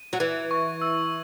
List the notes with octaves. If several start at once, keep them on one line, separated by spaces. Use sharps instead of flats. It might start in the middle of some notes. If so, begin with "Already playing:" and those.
Already playing: D#7
F#3
E3 G#6
C#6
E6